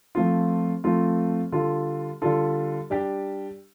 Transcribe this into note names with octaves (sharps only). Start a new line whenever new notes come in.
F3 A3 C4 F4
F3 A3 C4 F4
D3 G3 F4 A4
D3 G3 F4 A4
G3 D4 G4